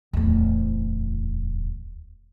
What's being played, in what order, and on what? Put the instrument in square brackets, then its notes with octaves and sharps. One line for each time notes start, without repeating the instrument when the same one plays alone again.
[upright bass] D1 E2